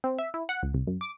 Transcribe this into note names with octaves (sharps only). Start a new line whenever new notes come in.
C4
E5
E4
F#5
C#2
C2
F#2
D6